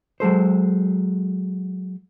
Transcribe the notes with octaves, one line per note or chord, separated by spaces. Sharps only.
F#3 G#3 A4 C5